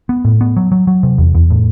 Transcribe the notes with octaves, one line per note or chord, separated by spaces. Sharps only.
B3
A2
B3
F#3
F#3
F#3
C3
E2
E2
A2